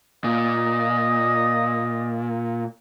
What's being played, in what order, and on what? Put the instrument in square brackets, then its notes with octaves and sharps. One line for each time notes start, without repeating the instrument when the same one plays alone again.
[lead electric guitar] A#2 [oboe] D#5